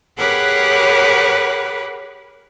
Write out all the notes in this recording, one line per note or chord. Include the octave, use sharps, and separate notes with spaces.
G4 G#4 A#4 B4 C#5 F#5